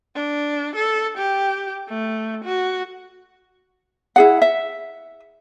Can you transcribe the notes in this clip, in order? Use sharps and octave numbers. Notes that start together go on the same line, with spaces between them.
D4
A4
G4
A3
F#4
E4 G#4 F#5
E5